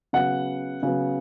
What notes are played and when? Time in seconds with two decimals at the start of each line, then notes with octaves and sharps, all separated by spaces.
0.13 C#3 F#3 B3 F#5
0.83 C#3 F#3 B3